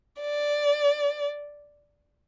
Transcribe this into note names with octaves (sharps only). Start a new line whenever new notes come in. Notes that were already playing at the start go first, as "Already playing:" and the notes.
D5